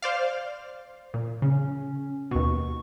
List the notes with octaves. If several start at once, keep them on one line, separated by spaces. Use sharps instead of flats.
C5 D5 F5
A#2
C#3 C#4
D#2 B2 C#6